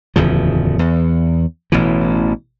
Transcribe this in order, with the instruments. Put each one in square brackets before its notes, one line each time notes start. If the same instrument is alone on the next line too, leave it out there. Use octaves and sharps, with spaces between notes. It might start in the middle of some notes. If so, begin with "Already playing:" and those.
[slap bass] D1 E2 C#3 F3
E2
A1 B2 E3